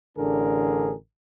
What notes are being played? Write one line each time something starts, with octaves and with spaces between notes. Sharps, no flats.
A1 D3 D4 G#4 A#4